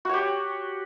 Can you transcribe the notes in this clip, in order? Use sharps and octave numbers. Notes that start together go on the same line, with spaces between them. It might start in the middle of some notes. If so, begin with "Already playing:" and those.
F#4 G4 C#5